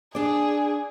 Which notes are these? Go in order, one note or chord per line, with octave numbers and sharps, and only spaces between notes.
D4 G#4 D5